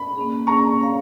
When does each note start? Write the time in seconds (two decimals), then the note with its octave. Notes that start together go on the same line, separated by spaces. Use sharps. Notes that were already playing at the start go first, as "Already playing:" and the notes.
Already playing: B5
0.16 A#3 C#4 G#4
0.47 A#3 C#4 G#4 A#5 C#6
0.79 C#4 G#4 C#5 F5